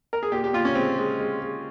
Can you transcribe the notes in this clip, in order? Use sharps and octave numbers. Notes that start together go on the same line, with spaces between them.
A#4
G#4
A#2 G4
G4
A#2 F4
C#4
G#3 C4
G#3
G#3
G#3